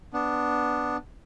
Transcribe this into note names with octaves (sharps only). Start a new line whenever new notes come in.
B3 D4